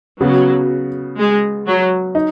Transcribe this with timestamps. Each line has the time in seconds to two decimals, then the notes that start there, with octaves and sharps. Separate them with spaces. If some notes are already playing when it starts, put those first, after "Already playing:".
0.21 C#3 F#3 B3 F#4
1.18 G#3
1.67 F#3
2.15 D#4